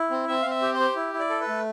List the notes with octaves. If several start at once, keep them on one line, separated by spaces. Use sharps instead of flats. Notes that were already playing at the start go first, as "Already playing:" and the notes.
Already playing: E4
C4
C4 E5
F5
C4 E5
G4
C5
G4
E4
E4
D5
A4
B4
A3